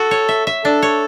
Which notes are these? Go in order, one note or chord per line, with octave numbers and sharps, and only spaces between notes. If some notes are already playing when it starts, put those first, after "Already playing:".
Already playing: F#4 A4
C#5
E5
E5
D4 A4
C#5